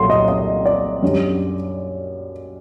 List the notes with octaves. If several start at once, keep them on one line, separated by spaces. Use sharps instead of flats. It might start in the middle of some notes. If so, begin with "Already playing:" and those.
Already playing: C2 A#2 F#3 A3 C6
D#5
D#5
D5
F#2 D3 G3